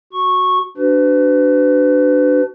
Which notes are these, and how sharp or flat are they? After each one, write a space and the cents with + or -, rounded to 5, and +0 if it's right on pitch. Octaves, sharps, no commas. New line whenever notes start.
F#4 -5 C#6 -10
D4 +0 F#4 +20 B4 +35